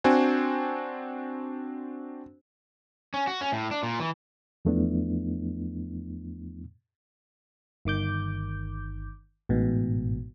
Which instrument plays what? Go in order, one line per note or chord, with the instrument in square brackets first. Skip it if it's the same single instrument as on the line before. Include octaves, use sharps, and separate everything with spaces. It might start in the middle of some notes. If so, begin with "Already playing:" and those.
[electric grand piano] C4 D4 F#4 C5 G#5
[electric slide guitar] C#4
F#4
C#4
A2
D4
A#2
E3
[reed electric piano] E2 F3 A3 B3 D4 E4
[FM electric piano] G1 D#3 D6 G6
A1 G#2 B2